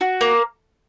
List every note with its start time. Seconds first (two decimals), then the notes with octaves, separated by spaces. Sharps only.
0.01 F#4
0.21 A#3